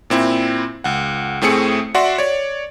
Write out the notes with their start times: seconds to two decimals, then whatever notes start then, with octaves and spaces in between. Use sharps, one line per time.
0.10 A#2 C4 E4
0.84 C#2 F#5
1.42 A2 A3 C4 G#4 C#7
1.95 F#4 D5 E5 F#5 C6
2.18 C#5 D5